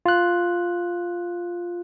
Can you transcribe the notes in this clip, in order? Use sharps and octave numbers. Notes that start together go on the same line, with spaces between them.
F4 F#6